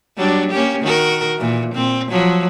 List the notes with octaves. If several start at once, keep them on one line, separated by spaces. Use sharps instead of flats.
F#3 G3 D4
A#3 C#4 G4
D#3 F#4 A#4
A#2 E3
A#2 C4
F3 F#3